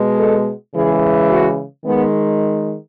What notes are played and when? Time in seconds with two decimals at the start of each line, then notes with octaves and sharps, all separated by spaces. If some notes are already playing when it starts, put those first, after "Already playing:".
Already playing: B2 G#3
0.17 A4
0.73 C#3 E3 G#3 G#4
1.29 F#4
1.85 D#3 G#3 B3